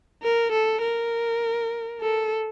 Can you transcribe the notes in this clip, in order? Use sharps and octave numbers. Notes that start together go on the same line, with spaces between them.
A#4
A4
A#4
A4